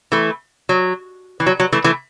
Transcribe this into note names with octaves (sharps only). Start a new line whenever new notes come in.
E3 A3
F#3
E3
F#3
F#3
E3 A3
E3 A3